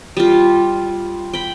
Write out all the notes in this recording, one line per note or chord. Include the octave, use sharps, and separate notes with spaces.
G3 F4
G5 B5